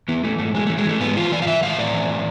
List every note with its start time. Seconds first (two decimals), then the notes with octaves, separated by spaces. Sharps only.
0.08 E3 B3
0.24 E3 A3
0.38 G#2 A3
0.55 E3 G#3
0.67 E3 A3
0.77 G#3
0.86 E3 A3
1.00 G#2 B3
1.16 E3 F4
1.32 E3 D5
1.42 F5
1.47 E3 E5
1.62 A2 F5
1.79 A2 D5
1.94 E3
2.09 A2